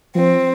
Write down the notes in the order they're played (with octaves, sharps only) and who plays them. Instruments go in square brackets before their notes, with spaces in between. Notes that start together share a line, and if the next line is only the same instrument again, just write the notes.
[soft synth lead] F3 [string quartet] C4